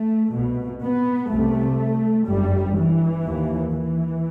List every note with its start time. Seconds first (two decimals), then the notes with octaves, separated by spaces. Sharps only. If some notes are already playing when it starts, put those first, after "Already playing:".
Already playing: A3
0.34 C2 B2
0.83 B3
1.31 C2 C3 A3
2.27 G1 F#2 G3
2.77 E3
3.24 D#2
3.73 E3